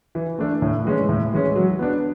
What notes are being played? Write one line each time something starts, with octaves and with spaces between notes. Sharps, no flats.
E3
A3 D4 A4
A2
E3 G#3 C#4
A2
E3 G#3 C#4
F#3
B3 D4